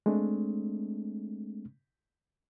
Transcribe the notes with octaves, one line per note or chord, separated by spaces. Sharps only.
G#3 A3 C4 D4